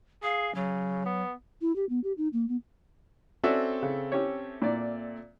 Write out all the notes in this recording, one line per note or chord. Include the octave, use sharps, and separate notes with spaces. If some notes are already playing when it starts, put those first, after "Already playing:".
G#4 F5
C#3 F#3
B3
E4
G4
B3
G4
D#4
A#3
B3
C4 C#4 F#4 A4 D5 E5
C#3
C#4 G4 C#5
A#2 D5